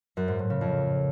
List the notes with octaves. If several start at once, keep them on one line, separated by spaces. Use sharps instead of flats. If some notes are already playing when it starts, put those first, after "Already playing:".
F#2
G#2
A2
C#3
F2